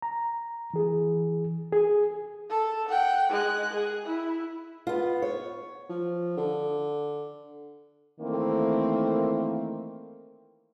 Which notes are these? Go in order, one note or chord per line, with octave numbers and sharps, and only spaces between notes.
A#5
E3 G#4
G#4
A4
F#5 G5
G#3 F#6
G#4
E4
B3 F4
C#5
F3
D3
D#3 E3 A3 A#3 C4